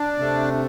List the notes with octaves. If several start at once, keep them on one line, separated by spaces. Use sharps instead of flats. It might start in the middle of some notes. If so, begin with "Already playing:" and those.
Already playing: D4
C3 A3